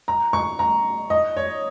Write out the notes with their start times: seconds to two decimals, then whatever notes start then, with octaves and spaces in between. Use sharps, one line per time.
0.08 A#5
0.33 C#6
0.59 A#5
1.10 D#5
1.37 C#5